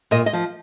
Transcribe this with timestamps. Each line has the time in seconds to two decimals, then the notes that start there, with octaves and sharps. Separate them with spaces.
0.11 A#2 D#5
0.26 D#5
0.33 F3